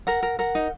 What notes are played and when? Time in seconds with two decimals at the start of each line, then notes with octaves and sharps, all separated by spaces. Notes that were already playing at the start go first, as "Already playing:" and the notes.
0.07 A#4 F#5
0.23 A#4
0.39 A#4 F#5
0.55 D#4